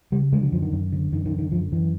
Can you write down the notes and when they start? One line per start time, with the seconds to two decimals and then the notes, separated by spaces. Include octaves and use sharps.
0.12 C#3 G3
0.32 D3 G#3
0.42 F#3
0.52 F#2 F3
0.62 D#3
0.72 F#2
0.92 D3
1.12 F#2 D#3
1.26 D#3
1.32 D3
1.39 D#3
1.52 F#2 F3
1.72 F#2 E3